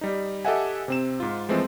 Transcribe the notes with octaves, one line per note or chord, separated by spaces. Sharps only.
G3 D#4
G4 A4 D#5 E5 F#5 G#5
C3 C4 E7
G#2 F4
E3 F3 G#3 A3 C4